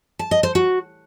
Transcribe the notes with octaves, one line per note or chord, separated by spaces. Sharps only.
A5
D#5
C5
F#4